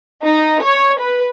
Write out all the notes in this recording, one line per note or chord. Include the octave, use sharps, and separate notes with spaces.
D#4
C#5
B4